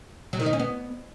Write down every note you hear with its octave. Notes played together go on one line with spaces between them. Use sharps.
F#3
D#3
D#4
C#4
B3